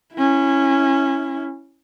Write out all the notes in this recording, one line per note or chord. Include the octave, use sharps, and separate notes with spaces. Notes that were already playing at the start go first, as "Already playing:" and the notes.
C#4 E4